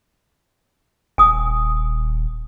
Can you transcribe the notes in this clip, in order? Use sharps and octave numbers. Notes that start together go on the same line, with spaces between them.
D#1 G#5 D#6